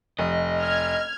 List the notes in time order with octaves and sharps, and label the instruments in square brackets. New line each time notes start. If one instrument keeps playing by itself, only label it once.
[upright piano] F1 [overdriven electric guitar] D#5
[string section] F6 G#6